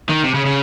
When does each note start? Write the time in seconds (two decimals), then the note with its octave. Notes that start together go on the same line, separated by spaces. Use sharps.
0.09 D#3
0.24 C3
0.35 C#3
0.46 C#3